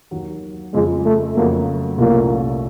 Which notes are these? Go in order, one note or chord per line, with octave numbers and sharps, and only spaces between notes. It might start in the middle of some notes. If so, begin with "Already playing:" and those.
D#2 D#3 F#3
F2 C#3 F3 G#3
A3
F2 C#3 F#3 A3 A#3
C2 A#2 F3 A3 A#3 C#4